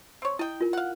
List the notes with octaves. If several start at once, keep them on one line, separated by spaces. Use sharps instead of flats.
C4 C#5
E4 D#5 G5
F4 A#4
F5 F#5